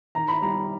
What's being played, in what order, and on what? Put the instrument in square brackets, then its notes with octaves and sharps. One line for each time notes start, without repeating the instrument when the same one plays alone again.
[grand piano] D#3 [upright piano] A#5
[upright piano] B5
[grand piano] G3 [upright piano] A#5